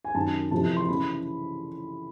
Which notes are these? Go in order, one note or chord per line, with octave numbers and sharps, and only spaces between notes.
G#5
F#2 D#3 A5
F2 C3 E3 A5
C6
C#3 E3 B5